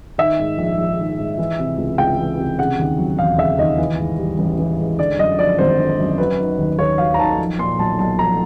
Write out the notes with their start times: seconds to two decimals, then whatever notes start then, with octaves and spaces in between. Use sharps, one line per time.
0.18 D#3 E5
0.39 G#2
0.58 A#1
0.78 A#1
0.99 D#3
1.19 G#2
1.38 E3
1.59 C3
1.78 C#2
1.98 C#2 G5
2.18 E3
2.39 C3
2.59 C#3 F#5
2.79 D#2
2.98 F#3
3.18 E1 F5
3.38 C#3 E5
3.58 D#2 D#5
3.78 E3
3.98 G#2
4.19 G3
4.39 A1
4.58 E3
4.79 G#2
4.99 D3 D5
5.18 F#2 D#5
5.39 F3 D5
5.59 G#1 C5
5.79 D3
5.99 F#2
6.18 F#3 B4
6.38 D#3
6.58 D#2
6.79 D#2 C#5
6.98 F#3 F5
7.14 A#5
7.19 D#3 A5
7.38 F3
7.59 A#2 C6
7.78 B1 A5
7.99 B1 A5
8.19 F3 A#5